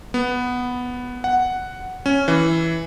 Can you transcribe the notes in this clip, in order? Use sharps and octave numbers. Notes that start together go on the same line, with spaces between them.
B3
F#5
C#4
E3